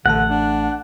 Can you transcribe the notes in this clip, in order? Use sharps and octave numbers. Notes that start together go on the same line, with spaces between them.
A1 D3 A3 F#5 A5
D4